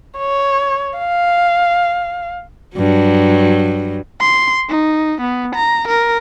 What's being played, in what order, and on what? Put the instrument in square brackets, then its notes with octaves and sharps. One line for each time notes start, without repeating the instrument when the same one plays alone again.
[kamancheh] C#5
F5
[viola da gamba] G2 F#3
[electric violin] C6
D#4
B3
A#5
A#4